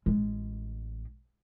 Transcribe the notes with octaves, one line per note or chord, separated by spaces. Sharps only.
A1 G#3